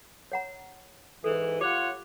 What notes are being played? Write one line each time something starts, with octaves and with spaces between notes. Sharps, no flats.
C#5 F#5 A#5
G#2 E3 A4
F4 G4 C#5 F#5 D6